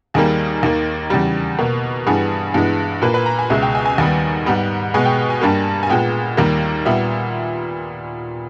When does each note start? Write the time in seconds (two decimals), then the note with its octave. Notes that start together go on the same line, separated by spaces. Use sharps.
0.14 D#2 D#3 G3 A#3 G#4
0.63 D#2 D#3 A#3
1.10 E2 C#3 G3 G4
1.59 B2 A#3
2.06 G2 E3 G3 B3 G#4
2.54 G2 E3 G#3 B3
3.02 A#2 A#3 B4
3.14 B4
3.26 A#5
3.39 G#5
3.50 C#2 B2 G#3 E5
3.62 G5
3.75 G#5
3.85 G#5
3.98 D#2 D#3 G3 B3 G#5
4.46 G#2 G3 B3
4.94 B2 G#3 B3 G#5
5.05 G5
5.30 G#5
5.41 G2 G3 A#3
5.83 G#5
5.90 A#2 G#3 B3 G5
6.37 D#2 D#3 G3 A#3
6.86 A#2 G3 B3 E5